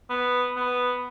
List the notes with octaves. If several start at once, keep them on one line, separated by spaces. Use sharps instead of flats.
B3
B3